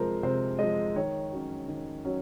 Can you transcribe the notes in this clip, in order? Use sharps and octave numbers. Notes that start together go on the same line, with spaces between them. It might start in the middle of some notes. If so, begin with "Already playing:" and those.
Already playing: C3 F3 G#3 A#4 C5
C3 C5
F3 G#3 D#5
D#3 C#5
F#3 C#4
D#3
F#3 C#4